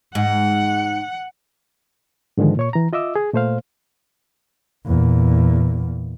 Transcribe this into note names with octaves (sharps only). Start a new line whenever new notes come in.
G#2 F#5
G#2 D3 D#3 F3 G#3
A#2 C#5 C#6
E3 A#5
F4 D#5 E5 D6 E6
G#4
A#2 A3 C5 F5
E2 A#2